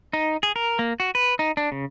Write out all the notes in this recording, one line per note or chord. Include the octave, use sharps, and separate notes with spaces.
D#4
G#4
A#4
A#3
F#4
B4
D#4
D4
C#3